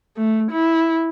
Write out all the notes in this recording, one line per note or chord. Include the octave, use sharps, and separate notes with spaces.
A3
E4